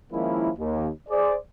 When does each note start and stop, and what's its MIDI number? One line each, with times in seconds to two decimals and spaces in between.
0.12 0.49 51
0.12 0.49 53
0.12 0.49 56
0.12 0.49 58
0.12 0.49 61
0.12 0.49 64
0.58 0.89 39
1.09 1.36 68
1.09 1.36 72
1.09 1.36 74